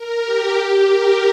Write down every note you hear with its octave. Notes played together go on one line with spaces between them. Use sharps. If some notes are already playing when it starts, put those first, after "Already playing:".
Already playing: A#4
G4
A#4